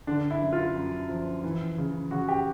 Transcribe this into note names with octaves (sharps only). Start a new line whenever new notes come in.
D3 D4
E4
F#2
F4
F#2
F3
E3
C#3
C#3 F#4
G4